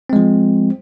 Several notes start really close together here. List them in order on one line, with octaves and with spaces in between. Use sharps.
C4 G#3 F3